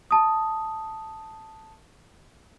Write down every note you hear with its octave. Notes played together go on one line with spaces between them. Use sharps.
A5 D#6